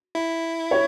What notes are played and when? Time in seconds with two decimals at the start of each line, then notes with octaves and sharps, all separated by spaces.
0.15 E4
0.71 C#5